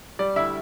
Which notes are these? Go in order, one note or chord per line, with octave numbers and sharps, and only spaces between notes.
G3 D5
D2 E4 E5